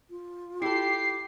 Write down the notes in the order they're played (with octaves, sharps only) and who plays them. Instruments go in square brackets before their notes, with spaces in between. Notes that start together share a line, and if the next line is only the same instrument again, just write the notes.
[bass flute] F4
[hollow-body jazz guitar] E4 A4 [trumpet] G4 [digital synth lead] C7